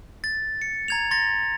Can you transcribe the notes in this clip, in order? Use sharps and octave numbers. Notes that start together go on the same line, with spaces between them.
A6
C#7
A#5 G#6 F7
C6 A6 A#6